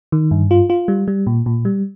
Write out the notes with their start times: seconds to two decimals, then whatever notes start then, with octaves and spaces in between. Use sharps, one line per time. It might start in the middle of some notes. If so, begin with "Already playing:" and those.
0.12 D#3
0.31 G2
0.51 F4
0.70 F4
0.88 G3
1.08 G3
1.27 A#2
1.46 A#2
1.65 G3